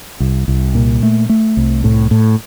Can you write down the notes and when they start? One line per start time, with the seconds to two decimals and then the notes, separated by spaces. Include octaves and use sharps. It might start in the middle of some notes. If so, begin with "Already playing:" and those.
0.20 C2
0.48 C2
0.75 A#2
1.03 A3
1.29 A3
1.57 C2
1.84 A2
2.11 A2